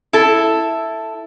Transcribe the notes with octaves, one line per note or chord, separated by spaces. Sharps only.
E4 A4